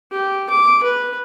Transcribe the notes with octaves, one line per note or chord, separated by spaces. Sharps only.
G4
D6
B4